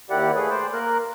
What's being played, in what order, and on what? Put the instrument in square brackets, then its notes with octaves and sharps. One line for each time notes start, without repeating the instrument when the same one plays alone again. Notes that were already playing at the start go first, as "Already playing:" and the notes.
[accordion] D#2 D#3 E4 G4 D5 F#5
A3 G#4 B4
C5 D5
A#3 A#4 F#6